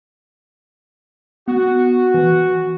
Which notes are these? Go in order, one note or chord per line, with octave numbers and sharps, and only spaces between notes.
B3 F#4
E3